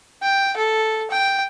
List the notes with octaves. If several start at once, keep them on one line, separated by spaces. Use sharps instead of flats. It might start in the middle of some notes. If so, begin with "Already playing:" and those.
G5
A4
G5